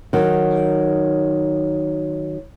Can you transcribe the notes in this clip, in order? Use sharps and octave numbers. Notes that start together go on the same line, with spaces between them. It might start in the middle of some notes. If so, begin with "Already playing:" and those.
D#3 F#3